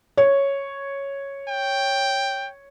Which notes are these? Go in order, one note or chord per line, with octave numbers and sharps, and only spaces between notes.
C#5
G5